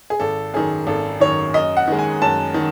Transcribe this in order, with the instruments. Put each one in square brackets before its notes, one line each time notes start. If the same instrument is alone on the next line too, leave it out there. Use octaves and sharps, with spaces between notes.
[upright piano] G#4
G#1 A4
F#2 D#3 G#4
G#1 A4
F#2 D#3 C#5
F#2 D#5
F#5
D#3 G#3
G#5
F#2 A5
D#3